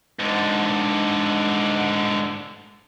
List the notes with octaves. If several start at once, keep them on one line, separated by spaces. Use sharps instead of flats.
G#2 D3